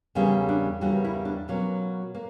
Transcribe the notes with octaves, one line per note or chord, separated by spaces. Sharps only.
E2 C#3 G3 A#3 C#4
D4
E2 C#3 G3 A#3 F#4
E4
D4
B2 F#3 A#3 C#4
A#3